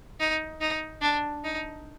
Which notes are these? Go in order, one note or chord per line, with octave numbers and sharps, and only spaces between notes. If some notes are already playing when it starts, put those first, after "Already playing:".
D#4
D#4
D4
D#4